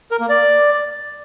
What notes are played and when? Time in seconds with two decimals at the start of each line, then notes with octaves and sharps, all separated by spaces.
0.11 A#4
0.20 A#3
0.29 D5